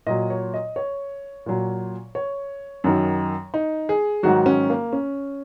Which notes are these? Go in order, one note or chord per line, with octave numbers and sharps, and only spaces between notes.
A#2 F#3 D#5
C#5
D#5
C#5
A#2 F#3
C#5
F#2 D#3 F#3
D#4
G#4
G#2 D#3 F#3 F#4
C#4
A#3
C#4